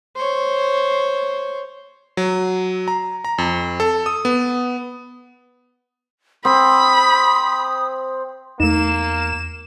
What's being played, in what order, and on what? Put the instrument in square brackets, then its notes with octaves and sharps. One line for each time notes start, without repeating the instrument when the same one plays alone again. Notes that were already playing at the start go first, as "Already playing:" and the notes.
[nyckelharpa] C5 C#5
[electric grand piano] F#3
A#5
A#5
F2
A4
D#6
B3
[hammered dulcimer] C4 [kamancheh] B5 [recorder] D#6
[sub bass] E2 [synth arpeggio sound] A3 D#4 [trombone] A#3 [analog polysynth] E7